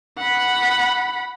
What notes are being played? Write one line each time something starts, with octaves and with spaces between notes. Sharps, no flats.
F#5 B5